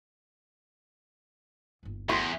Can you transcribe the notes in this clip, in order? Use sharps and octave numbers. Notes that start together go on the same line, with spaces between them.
G1 D#2
E2 A3 C4 E4 F#4 G4 C6